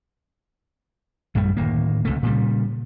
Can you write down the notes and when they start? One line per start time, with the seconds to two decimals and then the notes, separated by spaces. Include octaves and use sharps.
1.35 A#1 F#2 G3 A3
1.57 D1 D#3 A#3
2.05 C#2 C3 A3
2.23 A#2 C#3 G3